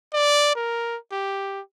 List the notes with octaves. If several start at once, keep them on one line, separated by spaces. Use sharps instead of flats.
D5
A#4
G4